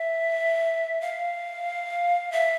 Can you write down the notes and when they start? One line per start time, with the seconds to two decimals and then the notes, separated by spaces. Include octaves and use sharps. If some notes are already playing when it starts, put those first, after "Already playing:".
Already playing: E5
1.01 F5
2.32 E5